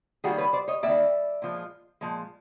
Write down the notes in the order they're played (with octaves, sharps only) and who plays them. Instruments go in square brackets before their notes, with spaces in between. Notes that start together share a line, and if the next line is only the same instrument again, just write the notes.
[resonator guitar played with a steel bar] D#3 G3 A#3 F#4 G#4
B4 C#5
C5 D5
C#5 D#5
D#3 G3 A#3 D5 E5
A#2 F3 G#3
A#2 F3 G#3